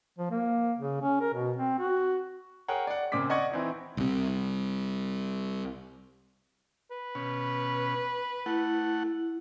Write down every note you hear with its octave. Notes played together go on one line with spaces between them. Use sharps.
F3
A#3
C#3
C#4
A#4
B2
C4
F#4
G#4 A#4 C#5 F#5 G5
D5 F#5
A#2 C#3 C4 D6 B6
D5 D#5 F#5 C#6 G#6
E3 C4 D#4
C2 C3
B4
B2 C#4
A3 E4 F#5